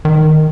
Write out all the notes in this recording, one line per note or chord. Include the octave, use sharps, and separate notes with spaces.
D#3